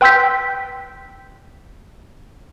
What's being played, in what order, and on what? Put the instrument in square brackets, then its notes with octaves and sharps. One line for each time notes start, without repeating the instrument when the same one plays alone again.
[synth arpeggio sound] B4 G5 C6 E6 G6 B6